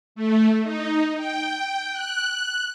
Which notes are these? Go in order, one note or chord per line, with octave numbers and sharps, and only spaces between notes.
A3
D#4
G5
F#6